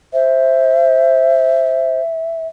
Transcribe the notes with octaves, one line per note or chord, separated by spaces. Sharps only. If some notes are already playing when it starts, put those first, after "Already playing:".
C5 E5